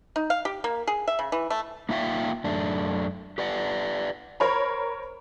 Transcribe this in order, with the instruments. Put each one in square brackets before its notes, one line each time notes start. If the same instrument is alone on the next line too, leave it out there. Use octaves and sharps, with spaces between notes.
[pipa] D#4
F5
G4
A#3
G#4
E5
C#3
E3
A3
[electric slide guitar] A#3 D#4 F4 E5 F5 G5
F#2 A3 D4
G4 B4 D5 F#5
[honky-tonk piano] A#4 C5 C#5 A#5 B5